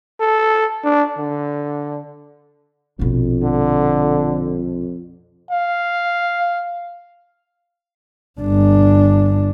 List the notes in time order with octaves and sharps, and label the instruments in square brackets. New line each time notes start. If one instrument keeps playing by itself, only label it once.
[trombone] A4
D4
D3
[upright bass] A#1 B2 [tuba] F2
[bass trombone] D3
[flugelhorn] F5
[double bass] G1 D4